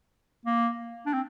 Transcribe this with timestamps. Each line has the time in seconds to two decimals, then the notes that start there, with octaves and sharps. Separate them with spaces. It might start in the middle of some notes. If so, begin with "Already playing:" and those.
0.46 A#3
1.06 D4
1.14 C4